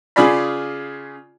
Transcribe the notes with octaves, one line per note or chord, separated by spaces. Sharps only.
C#3 F4 G#4 D5 B5